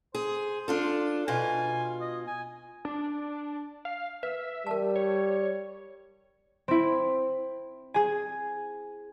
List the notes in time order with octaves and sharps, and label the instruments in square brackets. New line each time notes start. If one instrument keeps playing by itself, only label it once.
[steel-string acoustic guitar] G#4 [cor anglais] C5
[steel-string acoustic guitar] D4 F4 A4
[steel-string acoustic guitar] B2 F4 [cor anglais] G#5
[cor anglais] D#5
G#5
[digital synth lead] D4
F5
[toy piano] B4 [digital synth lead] E5
[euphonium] G3 [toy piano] A#4 A5
[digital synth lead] C#5
[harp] C4 E4
G#4 G#5